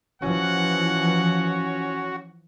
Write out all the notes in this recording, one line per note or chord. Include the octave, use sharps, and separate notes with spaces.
E3 F3 C#4 F#4 F#5